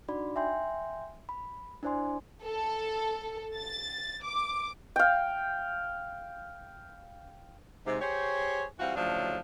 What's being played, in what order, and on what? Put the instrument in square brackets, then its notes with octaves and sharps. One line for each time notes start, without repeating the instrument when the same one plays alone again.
[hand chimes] D4 D#4 F#4 D5 B5
E5 G5 G#5 C6 G6
B5
D4 E4 C5 D5 G#5 C6
[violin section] A4
A6
D6
[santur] F5 G5
[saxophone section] G#2 C3
G4 G#4 C5 C#5
E3 G3 C4 F4 F#4
D2 A2 C#3 F3 F#3 D4